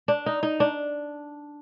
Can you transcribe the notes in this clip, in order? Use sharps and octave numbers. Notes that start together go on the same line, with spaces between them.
D4
D#4
D#4
D4